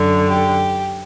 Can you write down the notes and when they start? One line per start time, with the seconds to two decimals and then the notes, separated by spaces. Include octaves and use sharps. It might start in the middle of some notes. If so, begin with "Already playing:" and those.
Already playing: F#2 D3
0.28 G4